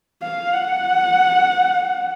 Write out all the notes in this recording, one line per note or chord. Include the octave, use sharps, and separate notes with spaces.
F5
F#5